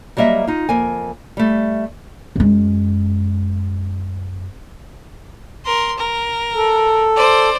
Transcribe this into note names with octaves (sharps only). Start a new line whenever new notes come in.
F#3 G3 A#3 D#5 E5
D#4 F4
F2 A#3 G#5
G3 A3
F#2 G#3
A#4 C6
A#4
A4
C5 D5